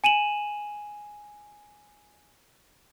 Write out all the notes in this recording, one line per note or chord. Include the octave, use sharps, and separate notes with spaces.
G#5 D#7 E7 F#7